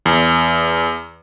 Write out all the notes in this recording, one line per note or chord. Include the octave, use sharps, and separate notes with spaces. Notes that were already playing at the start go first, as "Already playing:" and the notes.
E2